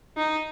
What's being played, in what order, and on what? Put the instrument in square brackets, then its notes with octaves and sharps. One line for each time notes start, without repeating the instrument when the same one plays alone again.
[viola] D#4